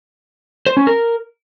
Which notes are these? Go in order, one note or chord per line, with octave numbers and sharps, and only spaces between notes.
C5
C#4
A#4